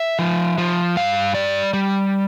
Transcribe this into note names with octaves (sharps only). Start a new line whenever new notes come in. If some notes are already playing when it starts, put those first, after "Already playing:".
Already playing: E5
F3
F3
G2 F5
G3 D5
G3